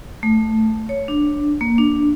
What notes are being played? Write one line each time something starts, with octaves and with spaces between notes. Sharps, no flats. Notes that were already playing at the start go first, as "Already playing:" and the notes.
A3
C#5
D4
A#3
D4